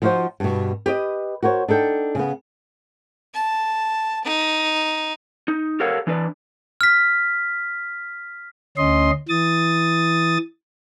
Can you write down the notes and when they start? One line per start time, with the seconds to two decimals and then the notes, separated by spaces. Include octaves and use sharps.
0.02 F3 D#4 F4 F#4 C5
0.40 G2 B2
0.86 G4 B4 D5 D#5
1.42 F#4 A#4 C5 C#5
1.68 D4 D#4 A4 G5
2.15 C#3 B3
3.34 A5
4.24 D#4
5.48 D#4
5.80 G4 A4 A#4 C#5 F5 F#5
6.07 E3 D4 B4 D5
6.81 F6 B6
8.77 D2 C#4 D#5 C6
9.29 E3 D#6 A6